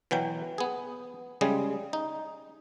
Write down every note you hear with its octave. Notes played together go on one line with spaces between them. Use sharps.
B2 E3 F#3 G5
B3 G#4
C#3 G3 G#3 G#4
D#4